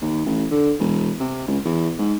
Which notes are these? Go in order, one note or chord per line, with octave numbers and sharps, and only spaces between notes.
D#2
A1
D3
E1
C3
C#2
E2
G#2